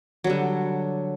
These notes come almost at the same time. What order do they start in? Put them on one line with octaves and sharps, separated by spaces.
F#3 G3 D3